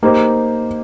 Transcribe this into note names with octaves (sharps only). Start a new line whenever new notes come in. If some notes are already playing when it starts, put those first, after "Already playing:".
A#3 D#4 G4 C5